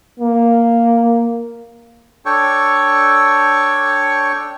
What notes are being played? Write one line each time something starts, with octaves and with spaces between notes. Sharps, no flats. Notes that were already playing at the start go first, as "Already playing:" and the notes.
A#3
D4 A4 C#5 G5 C#6